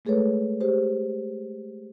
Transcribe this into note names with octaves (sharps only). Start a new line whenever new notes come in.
G#3 A3 G#4 A4 B4 C#5
G4 G#4 C5